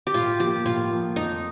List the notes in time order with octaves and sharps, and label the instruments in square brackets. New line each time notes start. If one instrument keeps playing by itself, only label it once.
[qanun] G4
[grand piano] A2 [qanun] F4
[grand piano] F3 A#3 [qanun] G4
[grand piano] A2 [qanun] F4
[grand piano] F3 A#3
[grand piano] F2 [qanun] D#4